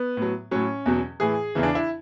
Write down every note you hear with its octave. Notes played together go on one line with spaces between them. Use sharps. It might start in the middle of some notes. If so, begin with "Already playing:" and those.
Already playing: B3
A2 F#3
A2 F#3 C#4
E2 B2 F#3
A2 E3 G#4
E2 C#3 E3
D4
E4